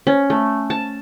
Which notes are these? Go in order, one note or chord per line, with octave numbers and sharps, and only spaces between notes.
C#4
A3
A5